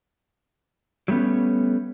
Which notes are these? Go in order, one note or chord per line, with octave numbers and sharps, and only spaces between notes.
F#3 G3 A3 B3 C#4